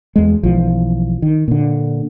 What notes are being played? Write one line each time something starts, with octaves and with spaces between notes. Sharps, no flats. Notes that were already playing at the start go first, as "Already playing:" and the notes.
E2 G#3
B1 E3 F3
D#3
A#2 D3